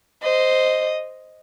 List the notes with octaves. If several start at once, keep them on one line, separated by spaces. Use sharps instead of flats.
C5 D#5